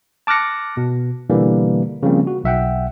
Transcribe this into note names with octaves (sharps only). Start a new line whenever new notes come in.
A5 D6 F6 F#6 A#6 C#7
B2
B2 D3 E3 G3 A#3
C#3 F3 G3 A#3 C4
F#4
B1 E5 F#5 G5